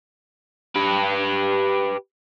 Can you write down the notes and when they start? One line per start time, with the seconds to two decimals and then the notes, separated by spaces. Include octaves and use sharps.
0.76 G4 B4